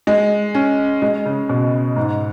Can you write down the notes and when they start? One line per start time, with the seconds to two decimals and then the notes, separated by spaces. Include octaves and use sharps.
0.07 G#3
0.55 C#4
1.02 G#3
1.26 C#3
1.49 B2
1.96 G#2